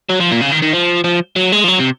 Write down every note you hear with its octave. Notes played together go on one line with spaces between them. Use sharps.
F#3
F3
A#2
C#3
D#3
D#3
F3
F3
F#3
G#3
F3
F#3
C3